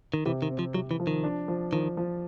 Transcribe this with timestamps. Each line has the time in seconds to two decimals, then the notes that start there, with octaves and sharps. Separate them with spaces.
0.14 D#3
0.25 C3 E3
0.42 D#3
0.50 C4
0.59 F3
0.74 C3 F#3
0.91 E3
1.00 F3
1.07 D#3
1.24 D4
1.48 F3
1.72 D#3 F3
1.97 F3